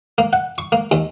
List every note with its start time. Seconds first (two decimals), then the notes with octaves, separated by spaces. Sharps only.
0.18 A#3
0.33 F#5
0.58 C#6
0.72 A#3
0.91 D#2